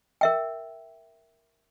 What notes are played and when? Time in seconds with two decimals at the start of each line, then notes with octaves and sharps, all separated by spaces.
0.21 A#4 E5 G5